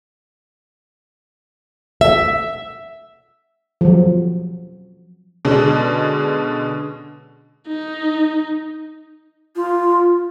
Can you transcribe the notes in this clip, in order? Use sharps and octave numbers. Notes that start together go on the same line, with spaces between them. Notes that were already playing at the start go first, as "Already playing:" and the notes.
E5
F3 F#3
B2 D3 G#3 C#4 D4
D#4
F4